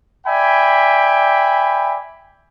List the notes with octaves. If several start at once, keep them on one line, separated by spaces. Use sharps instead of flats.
D5 E5 G5 G#5 B5